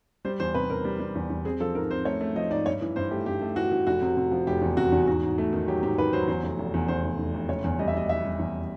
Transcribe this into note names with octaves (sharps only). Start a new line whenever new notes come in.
G3 C5
E2 C5
C3 B4
C3 A#4
G3
G3
E2
E2
C4 G#4
F3 A4
G#2 A#4
C4 C5
A3 C#5
A3
F3 D#5
G#2 D5
G2 C#5
E3
G2 C5
A3 G4
G2 G4
A3
E3 F#4
E3
F1 F#4
C3
C3
F3
F1 G4
E2
C3 F#4
E2
G#2 F#4
G#2
A3
D#3
F#3 G4
G#2 G4
D#3 B4
F#3 C5
E2 C5
F1
F1
E2
E2 C5
F1
F1
F1
F#1 C#5
E2
G3 D#5
E5
G3 D#5
G3 E5
G3
E2